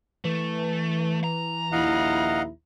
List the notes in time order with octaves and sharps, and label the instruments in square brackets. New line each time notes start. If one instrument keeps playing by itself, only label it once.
[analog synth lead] E3 [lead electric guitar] A3
[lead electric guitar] A#5
[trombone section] A#1 D#2 E4 [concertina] D#5 F5 F#5